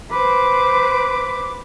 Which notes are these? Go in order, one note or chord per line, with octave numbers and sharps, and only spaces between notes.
B4 C5 D6